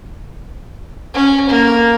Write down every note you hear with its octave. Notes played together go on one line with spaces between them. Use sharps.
C#4
A#3